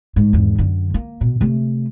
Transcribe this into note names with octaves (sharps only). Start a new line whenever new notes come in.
G#2
G#1 E2
F#2 D3
A#3
B2
C3 A3